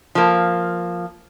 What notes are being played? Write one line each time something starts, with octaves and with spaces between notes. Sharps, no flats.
F3 A#3